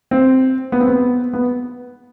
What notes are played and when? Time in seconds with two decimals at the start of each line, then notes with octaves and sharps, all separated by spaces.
0.11 C4
0.72 B3
0.80 C4
0.88 B3
1.33 B3